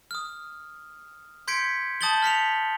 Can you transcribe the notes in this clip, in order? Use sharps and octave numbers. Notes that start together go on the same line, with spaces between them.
D#6 F6
C6 G6 G#6 B6 C#7 D7
A5 D#6 G6 A6 F#7 G7
F6 B6 C#7 F7